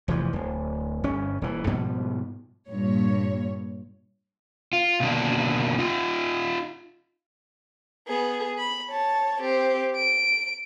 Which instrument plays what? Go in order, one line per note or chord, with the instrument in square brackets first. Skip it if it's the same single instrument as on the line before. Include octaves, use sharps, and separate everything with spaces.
[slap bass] F1 E3 F3
D1
G1 C#4
D#1 E3
G#2 B2 F3 G3
[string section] G2 A#2 C#5
[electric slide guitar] F4
B2 D3 D#3 F#3 A#3 D4
D#4 F4
[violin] B3 G#4
B5
C#5 A5
C4 G4
D7